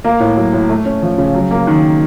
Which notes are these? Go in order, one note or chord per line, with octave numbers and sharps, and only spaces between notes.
A#3
A2
F#3
A2
A3
C#4
F3
C#3
F#3
A#3
D#3